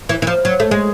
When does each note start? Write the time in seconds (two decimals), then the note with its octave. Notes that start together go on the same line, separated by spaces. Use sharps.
0.09 E3
0.22 E3
0.27 F3
0.45 F#3
0.60 A3
0.71 G#3